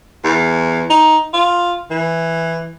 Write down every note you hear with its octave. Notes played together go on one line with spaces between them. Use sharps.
E2
D#4
F4
E3